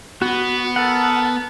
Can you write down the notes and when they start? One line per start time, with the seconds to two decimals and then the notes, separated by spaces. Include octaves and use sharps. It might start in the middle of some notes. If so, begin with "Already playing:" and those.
0.22 B3 F#4
0.76 A4 A#4 F#5 A5